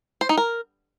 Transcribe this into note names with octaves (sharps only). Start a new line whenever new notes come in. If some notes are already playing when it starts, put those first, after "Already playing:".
C5
D#4
A#4